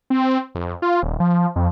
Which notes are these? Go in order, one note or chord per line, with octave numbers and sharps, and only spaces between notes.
C4
F2
F4
D#1
F3
F2